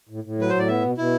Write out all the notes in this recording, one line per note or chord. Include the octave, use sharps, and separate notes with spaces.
A2
A2
F#3 B4
A2 C5
D5
B3 E5
B2
B2 E4